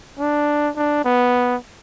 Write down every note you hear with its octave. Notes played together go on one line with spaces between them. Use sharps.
D4
D4
B3